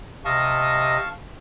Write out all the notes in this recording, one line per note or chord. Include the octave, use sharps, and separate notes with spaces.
C3 D#5 F5 A5 C#6 A#6